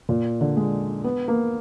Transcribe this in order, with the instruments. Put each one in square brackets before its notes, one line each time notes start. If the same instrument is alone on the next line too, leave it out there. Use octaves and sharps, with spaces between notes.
[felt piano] A#2
D3
G#3
B3
A#3